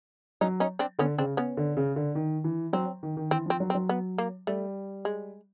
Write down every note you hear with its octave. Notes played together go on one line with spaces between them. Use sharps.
F#3 C#4 D#4
C#4 D#4
C4 D4
D3 B3 C#4
C#3 C4 D4
B3 C#4
D3
C#3
D3
D#3
E3
F#3 C4
D#3
D#3
E3 C4
F3 C4
F#3
C4
F#3
B3
A#3
G3 A3
G#3